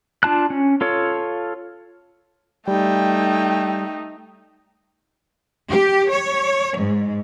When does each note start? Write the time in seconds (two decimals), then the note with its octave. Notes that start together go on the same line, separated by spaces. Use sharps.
0.23 D4 F4 A5 F#6
0.50 C#4
0.81 F4 A4 C#5
2.68 G3 A3 D#4 G5
5.70 G4
6.10 C#5
6.77 G#2